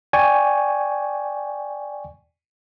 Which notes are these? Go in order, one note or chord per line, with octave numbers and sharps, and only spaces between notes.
D5 G5 G#5 C#6